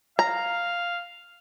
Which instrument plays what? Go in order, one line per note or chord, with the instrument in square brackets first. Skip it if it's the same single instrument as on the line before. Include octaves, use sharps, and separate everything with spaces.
[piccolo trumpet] F5 [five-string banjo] A#5